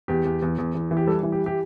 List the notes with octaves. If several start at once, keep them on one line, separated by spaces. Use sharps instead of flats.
E2 G4
E2
E2
E2
E2
E3
G4
G3 A4
E3
G4
G4